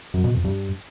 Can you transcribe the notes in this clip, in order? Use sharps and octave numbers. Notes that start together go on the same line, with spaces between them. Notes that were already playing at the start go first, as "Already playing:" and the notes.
F#2
B2
F2
G2